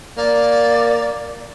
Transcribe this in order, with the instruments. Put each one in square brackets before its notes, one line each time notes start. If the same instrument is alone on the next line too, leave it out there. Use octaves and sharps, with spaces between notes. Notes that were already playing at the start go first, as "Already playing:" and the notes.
[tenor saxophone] A#3 [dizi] D5